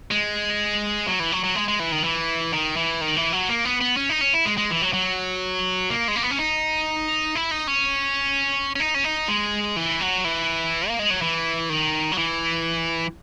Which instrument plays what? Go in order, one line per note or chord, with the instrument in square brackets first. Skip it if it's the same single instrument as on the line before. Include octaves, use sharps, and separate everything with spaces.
[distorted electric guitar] G#3
F#3
E3
F#3
F#3
G#3
G#3
E3
D#3
E3
D#3
E3
D#3
E3
F#3
A#3
B3
B3
C#4
D#4
C#4
E4
G#3
G#3
E3
F#3
F#3
A#3
G#3
A#3
B3
C#4
D#4
E4
D#4
C#4
C#4
D#4
C#4
D#4
G#3
E3
F#3
E3
A#3
G#3
F#3
E3
D#3
F#3
E3